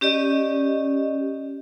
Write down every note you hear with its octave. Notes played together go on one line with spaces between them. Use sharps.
C#4 G4 D5 D#5